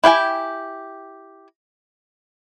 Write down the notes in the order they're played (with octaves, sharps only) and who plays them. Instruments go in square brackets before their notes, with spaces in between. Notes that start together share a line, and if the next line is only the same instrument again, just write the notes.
[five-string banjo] E4 G4 G5 G#5